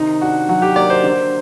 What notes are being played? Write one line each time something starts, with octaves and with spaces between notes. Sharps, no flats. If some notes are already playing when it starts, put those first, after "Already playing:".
Already playing: C3 D#3 D#4
D4 F#4
F#3 F#4
G4
A#3 D5
C5
D3